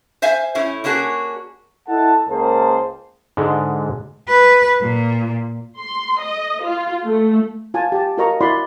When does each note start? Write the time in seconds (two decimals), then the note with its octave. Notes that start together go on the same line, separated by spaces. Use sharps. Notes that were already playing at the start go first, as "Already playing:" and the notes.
0.22 C5 E5 F5 G#5
0.55 A2 C#4 E4
0.84 A#3 C#4 D4 F#4 G#4
1.88 E4 A4 D#5 F#5 A5
2.28 C#2 A#3 G#4 A#4 C5 A5
3.37 G#2 D3 G#3
4.28 B4
4.81 A#2
5.78 C6
6.19 D#5
6.63 F4
7.04 A3
7.74 F4 G#5 A5
7.92 G4 A5
8.17 F4 F#4 A#4 D#5 A#5 C#6
8.41 E4 F#4 A#4 D5 B5 C6